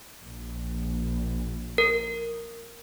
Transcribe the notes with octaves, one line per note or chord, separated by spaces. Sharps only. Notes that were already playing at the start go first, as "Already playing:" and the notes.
A#1
A#4